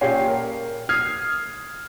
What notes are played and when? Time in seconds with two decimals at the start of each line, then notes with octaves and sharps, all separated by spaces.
0.01 A#2 C#4 G4 G#4 C#5 C7
0.28 A#4
0.89 D#6 F6 G#6 C7